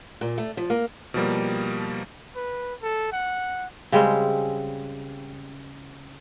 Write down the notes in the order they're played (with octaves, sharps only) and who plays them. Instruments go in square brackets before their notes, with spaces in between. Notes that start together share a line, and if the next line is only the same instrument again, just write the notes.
[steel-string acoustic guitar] A#2
A3
F3
A#3
[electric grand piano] B2 F3 G3 A#3
[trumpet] B4
A4
F#5
[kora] C#3 G3 G#3 C4